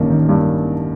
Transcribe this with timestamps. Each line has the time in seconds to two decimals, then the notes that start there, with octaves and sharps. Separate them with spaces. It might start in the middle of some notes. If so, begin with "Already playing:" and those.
Already playing: A1 G2 D#3 A#3
0.10 D#3
0.29 G2